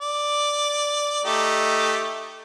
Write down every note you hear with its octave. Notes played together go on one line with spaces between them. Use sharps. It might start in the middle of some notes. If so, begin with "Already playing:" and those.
D5
A3 D#4 G4